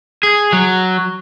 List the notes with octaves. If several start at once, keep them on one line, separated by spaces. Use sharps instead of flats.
G#4
F#3